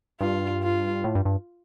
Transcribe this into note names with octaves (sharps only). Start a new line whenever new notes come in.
G2 F4
F4
A2
G2
G2